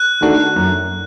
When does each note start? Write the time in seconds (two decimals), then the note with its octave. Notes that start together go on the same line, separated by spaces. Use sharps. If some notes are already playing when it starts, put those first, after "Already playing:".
Already playing: F#6
0.21 D#3 A3 D4 F#4
0.56 F#2